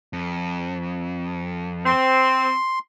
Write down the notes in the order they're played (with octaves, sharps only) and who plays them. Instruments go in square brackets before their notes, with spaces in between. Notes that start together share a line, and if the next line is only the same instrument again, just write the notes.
[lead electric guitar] F2
[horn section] C4 [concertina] C6